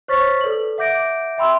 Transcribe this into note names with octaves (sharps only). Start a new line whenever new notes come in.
C5 C#5 C#6 F6 A6 B6
A4 B4 D5 F#7
E5 F#5 D6 G6 A#6 D7
E5 G5 B5 C6 E6